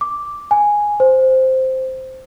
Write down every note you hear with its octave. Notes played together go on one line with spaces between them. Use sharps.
D6
G#5
C5